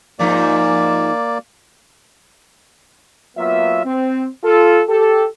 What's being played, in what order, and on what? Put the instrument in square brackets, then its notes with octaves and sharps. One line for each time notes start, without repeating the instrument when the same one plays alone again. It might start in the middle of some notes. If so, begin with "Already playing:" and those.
[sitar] G#2 F3 D#4 [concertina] A#3 D5
[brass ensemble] F#3 A#3 B3 F4 E5
C4
F4 A4
G4 A4